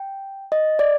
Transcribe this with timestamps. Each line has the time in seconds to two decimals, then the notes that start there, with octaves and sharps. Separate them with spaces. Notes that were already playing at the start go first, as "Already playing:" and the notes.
Already playing: G5
0.52 D#5
0.79 D5